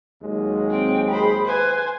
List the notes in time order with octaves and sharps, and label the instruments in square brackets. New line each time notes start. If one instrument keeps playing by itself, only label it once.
[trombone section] D#2 F#3 G#3
[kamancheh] C4 [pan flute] G5
[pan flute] G#4 [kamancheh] C5 B5
[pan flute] B4 [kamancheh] C5 G#5